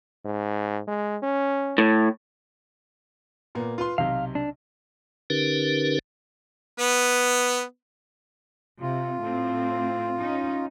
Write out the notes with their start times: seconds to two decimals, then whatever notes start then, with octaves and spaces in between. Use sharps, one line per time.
0.25 G#2
0.88 G#3
1.22 C#4
1.78 A2
3.55 A#2 A#3 B3
3.78 F4 B4 C6
3.98 B1 C3 F5
4.35 D4
5.30 D3 C#4 D#4 G4 A#4 B4
6.79 B3 B4
8.81 C3 F4
9.22 A2 C4
10.17 C#4 D#4